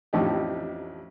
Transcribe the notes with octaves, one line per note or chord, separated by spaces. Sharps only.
A1 F2 A2 D4 D#4 G4